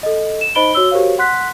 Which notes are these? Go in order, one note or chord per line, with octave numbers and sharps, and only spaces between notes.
A4 D#5
E7
D#4 C5 D#5 B5 D7 G7
F#4 C#5 E6 G7
F#4 G4 A#4 C5 C#5 F5
F#5 C6 F#6 B6